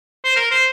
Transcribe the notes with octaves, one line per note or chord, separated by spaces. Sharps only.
C5
A#4
C5